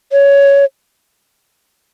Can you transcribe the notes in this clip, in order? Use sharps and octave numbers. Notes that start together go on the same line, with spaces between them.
C#5